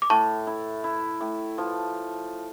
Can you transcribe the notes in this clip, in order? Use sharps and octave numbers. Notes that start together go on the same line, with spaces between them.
D6
A2 A5 C#6
E4
E4
A2
F3